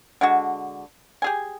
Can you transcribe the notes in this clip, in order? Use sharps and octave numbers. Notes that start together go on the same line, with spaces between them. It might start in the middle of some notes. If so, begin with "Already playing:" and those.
D3 G#3 F#4
G4 G#4 G#5